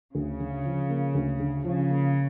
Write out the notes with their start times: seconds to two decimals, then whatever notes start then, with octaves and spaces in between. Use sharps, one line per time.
0.15 D2 C#3
0.40 D3
0.65 F3
0.90 A#3
1.15 D2
1.40 D3
1.64 C#3 F3
1.90 A#3